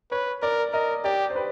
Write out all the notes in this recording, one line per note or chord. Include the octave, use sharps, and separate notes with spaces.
B4 C#5
A#4 D5
A#4 D#5
G4 D5
C5
B4